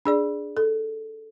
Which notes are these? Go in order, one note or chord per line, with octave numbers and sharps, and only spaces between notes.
D4 G#4 D5
A4